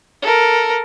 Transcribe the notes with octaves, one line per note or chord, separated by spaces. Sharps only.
A4 A#4